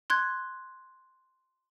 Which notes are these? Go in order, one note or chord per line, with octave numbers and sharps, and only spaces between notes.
C6 F#6 G#6